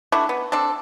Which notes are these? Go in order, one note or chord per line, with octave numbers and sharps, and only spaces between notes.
A3 D4 E4 F#4
B3
C4 D4 A4